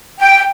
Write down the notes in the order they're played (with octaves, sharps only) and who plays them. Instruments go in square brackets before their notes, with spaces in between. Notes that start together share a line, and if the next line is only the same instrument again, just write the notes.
[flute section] G5